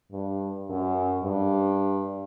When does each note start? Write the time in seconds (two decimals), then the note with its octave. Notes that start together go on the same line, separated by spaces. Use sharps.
0.12 G2
0.70 F#2
1.23 G2